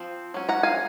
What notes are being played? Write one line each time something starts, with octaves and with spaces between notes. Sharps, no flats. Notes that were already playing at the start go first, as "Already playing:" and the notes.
Already playing: F3 C4
F#3 C#4
F#5 A#5
F5 G#5